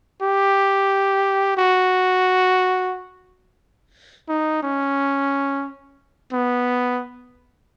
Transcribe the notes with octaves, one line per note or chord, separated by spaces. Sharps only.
G4
F#4
D#4
C#4
B3